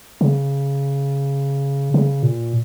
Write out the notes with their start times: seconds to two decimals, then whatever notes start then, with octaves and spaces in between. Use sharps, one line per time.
0.21 C#3
1.94 C#3
2.23 A#2